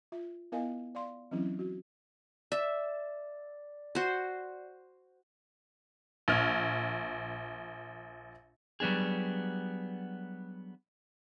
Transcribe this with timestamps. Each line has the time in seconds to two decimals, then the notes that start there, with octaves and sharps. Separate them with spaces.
0.12 F4 E5
0.52 B3 E4 A#4 D#5 F5 G#5
0.95 D5 F5 C6
1.31 E3 F#3 C4 C#4 E4
1.59 F#4
2.52 D5 E5
3.95 F#4 C5
6.28 A#1 F6 G#6
8.80 F#3 G3 B3 D4 G#4